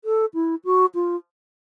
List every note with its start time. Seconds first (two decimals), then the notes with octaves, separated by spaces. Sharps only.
0.05 A4
0.34 E4
0.65 F#4
0.95 F4